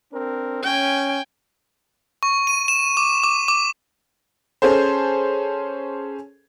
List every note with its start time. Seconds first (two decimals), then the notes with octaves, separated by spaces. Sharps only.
0.12 C4 D4 A#4
0.63 C#4 G5 G#5
2.23 C#6
2.47 D#7
2.68 E7
2.97 D6
3.23 D6
3.48 D6
4.62 C#4 G#4 A4 C5